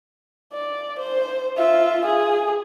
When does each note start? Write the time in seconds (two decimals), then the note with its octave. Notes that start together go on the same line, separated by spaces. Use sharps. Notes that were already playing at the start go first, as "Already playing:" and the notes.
0.53 D5
0.99 C5
1.57 F4 E5
2.05 G#4